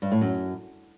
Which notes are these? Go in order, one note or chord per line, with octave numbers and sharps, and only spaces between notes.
G2
A2
F#2